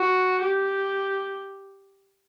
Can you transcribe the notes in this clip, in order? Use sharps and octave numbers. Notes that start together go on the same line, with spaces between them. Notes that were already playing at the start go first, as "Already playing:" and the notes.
Already playing: F#4
G4